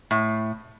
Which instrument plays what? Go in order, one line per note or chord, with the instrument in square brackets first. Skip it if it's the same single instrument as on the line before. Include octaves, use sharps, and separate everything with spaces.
[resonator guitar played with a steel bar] A2